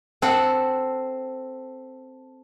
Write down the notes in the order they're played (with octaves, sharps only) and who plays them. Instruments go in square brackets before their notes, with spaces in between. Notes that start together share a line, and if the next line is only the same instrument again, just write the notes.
[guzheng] C4 A4 F#5 A5